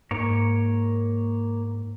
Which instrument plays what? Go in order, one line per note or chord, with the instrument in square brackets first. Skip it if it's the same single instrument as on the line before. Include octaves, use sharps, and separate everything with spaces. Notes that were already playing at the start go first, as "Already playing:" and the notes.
[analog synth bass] G#2 [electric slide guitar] A#3 C#5